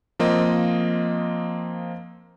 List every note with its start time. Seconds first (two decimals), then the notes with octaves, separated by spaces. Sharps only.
0.19 F3 A#3 C4 D#5